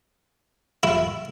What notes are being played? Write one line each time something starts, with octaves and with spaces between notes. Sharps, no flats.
E4